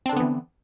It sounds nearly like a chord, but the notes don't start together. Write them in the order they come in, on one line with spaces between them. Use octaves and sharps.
C4 D4 D3 B3 E3